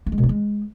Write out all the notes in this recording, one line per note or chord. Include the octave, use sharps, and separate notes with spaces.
A#3
G#3
B2
D4
G#3